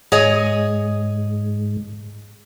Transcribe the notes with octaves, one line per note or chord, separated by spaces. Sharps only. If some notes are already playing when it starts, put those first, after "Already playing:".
G#2 G#4 C#5 D#5